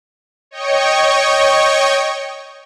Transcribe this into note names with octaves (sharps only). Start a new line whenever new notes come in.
C#5 D#5 G5 C#6